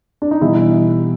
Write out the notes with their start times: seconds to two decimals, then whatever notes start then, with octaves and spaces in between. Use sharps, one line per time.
0.22 D4
0.31 D#4
0.41 B2 E3 G3 E4